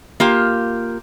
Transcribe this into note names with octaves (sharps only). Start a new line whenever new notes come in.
A#3 F4 G4